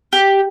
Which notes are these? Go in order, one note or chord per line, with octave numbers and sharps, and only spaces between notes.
G4